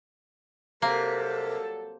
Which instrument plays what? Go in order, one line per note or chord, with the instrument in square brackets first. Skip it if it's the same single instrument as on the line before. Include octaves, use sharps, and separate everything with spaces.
[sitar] C3 [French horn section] F#3 G3 A4 [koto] A#3 [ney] A#4